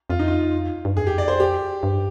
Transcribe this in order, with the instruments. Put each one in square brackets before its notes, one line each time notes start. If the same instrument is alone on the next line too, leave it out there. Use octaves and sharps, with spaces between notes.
[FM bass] F2 [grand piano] F4
[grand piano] D#4
F4
[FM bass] G2
[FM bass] F2 [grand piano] G#4
[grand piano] G4
D5
C5
G4
[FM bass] G2